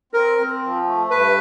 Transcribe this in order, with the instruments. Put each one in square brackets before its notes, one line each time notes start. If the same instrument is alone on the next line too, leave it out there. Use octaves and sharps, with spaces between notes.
[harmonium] C4 [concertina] A#4
[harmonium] C4
F3
A3
[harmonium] G2 [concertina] B4